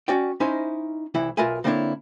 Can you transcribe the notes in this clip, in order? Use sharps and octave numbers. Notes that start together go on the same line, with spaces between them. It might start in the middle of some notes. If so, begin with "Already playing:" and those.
C#4 F#4 D5 G5
C#4 D#4 E4 C5 D#5 E5
C2 E3 E4 E5
B1 F4 A#4 B4 E5 G#5
D3 A#3 C4 D4 E4 C#5